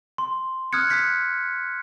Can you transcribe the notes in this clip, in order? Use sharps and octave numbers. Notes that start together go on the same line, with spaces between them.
C6
D#6 F6 F#6 G#6 C#7
D#6 F#6 G6 B6 C#7